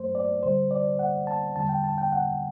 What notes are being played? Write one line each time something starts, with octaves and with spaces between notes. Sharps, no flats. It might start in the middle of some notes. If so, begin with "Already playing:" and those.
Already playing: G2 F#3 A3 C5
D5
D2 D3 G3 C5
D5
F#5
A5
E2 D3 G3 A5
G5
A5
G5
F#5